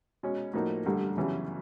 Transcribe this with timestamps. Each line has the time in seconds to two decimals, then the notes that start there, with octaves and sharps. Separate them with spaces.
0.23 B2 G#3 C#4
0.54 A2 F3 A#3 D#4 F#4
0.86 A1 G2 D3 G3
1.17 F#2 C#3 E3 G3 B3